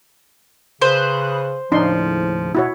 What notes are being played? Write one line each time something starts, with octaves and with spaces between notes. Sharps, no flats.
C#3 B4 C5 D#6 F#6
D#2 A2 C#3 F3 D4 D#4 C6
B2 E4 F#4 C#5